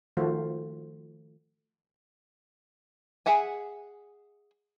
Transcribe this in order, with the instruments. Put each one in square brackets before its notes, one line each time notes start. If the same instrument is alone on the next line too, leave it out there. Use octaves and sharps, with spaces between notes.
[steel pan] D#3 F3 A3 F4 F#4 C5
[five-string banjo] G#4 E5 F#5 G#5